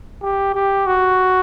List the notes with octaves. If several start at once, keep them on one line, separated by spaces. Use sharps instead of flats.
G4
G4
F#4